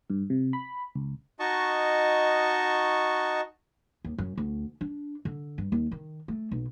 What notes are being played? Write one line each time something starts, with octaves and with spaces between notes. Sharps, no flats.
G2
C3
B5
C#2
D#4 F#4 D#5 A5 C#6
D#2
F#2
D2
D4
D3
G2
D#2
D#3
A3
B1